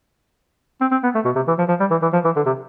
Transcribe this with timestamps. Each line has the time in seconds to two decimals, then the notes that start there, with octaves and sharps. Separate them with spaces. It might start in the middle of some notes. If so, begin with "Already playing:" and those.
0.81 C4
0.91 C4
1.04 B3
1.15 A3
1.25 B2
1.36 C3
1.48 E3
1.59 F3
1.69 F3
1.80 G3
1.91 E3
2.02 E3
2.13 F3
2.25 E3
2.36 D3
2.46 C3